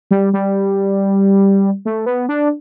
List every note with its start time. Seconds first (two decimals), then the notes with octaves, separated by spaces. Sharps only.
0.11 G3
0.33 G3
1.85 A3
2.06 B3
2.29 D4